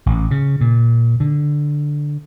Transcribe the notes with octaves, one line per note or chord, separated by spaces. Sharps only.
A1
C#3
A#2
D3